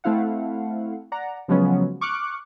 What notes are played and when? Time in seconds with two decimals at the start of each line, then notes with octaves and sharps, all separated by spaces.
0.04 A3 C4 E4 F5 F#5
1.12 D5 F#5 A#5
1.48 C#3 F3 F#3 G#3 B3 C#4
2.01 C#6 D6 F6 F#6 C#7